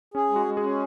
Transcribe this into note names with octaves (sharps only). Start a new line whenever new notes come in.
C#4 G#4
G#3
F#4
G#3
G#4
C#4